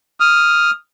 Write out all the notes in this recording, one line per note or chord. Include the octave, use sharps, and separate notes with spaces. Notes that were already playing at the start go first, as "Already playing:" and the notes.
D#6 F6